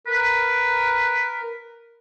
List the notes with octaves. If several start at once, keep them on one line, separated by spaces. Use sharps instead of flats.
A#4 B4